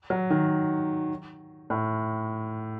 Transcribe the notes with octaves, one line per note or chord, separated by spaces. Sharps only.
F#3
D#3
A2